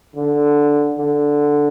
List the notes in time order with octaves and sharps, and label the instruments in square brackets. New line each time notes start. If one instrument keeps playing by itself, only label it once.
[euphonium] D3
D3